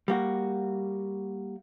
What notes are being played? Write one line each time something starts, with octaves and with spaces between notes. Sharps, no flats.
G3 A#3 F#4